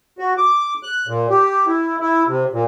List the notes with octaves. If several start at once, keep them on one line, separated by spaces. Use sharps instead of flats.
F#4
D6
F#6
A#2
G4
E4
E4
C3
A#2